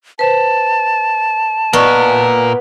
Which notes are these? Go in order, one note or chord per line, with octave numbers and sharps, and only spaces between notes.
B4 C5 A5
A#2 B3 A#4 D5 D#5 C#6